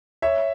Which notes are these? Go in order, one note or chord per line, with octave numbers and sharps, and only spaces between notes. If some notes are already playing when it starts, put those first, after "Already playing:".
C#5 E5